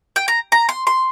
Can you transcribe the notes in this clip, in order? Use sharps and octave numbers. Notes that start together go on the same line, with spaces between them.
G5
A#5
A#5
C6
C6